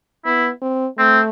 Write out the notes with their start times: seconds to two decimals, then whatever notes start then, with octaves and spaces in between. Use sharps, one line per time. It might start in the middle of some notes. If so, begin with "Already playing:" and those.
0.25 B3 E4
0.62 C4
0.98 A3 C4